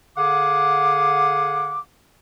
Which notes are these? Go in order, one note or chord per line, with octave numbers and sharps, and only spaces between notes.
D3 G#4 F5 F#5 D6